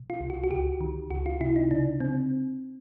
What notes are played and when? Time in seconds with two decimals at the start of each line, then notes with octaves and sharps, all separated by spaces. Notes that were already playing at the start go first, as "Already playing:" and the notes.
Already playing: B2
0.10 F4
0.21 C2
0.30 F#4
0.44 F#4
0.50 C#2 G4
0.81 D#3
1.11 C#2 F#4
1.26 F4
1.41 C3 E4
1.56 D#4
1.71 C#3 D4
2.00 C#3 C4